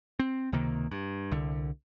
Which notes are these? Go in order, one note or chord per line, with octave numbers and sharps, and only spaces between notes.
C4
C#2 C3 D#3 A#3
G2
C2 D3